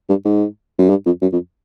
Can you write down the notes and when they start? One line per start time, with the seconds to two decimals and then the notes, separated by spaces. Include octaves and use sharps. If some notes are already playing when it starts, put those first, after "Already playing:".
0.09 G2
0.25 G#2
0.78 F#2
0.90 G2
1.06 F2
1.22 F#2
1.33 F2